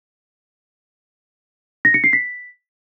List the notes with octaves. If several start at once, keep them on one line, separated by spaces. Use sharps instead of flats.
A#6
C#7
C7
B6